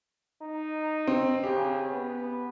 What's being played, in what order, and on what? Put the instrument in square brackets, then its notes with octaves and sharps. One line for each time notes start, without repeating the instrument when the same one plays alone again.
[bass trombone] D#4
[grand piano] C4
[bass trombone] C#3 [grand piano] G4
[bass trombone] B3